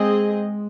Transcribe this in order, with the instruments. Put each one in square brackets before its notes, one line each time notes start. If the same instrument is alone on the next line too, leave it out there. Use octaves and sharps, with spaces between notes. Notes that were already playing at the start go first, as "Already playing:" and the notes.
Already playing: [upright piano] G#3 [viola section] C4 G#4 D#5